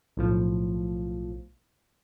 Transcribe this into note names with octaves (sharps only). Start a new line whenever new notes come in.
B1 A2 F3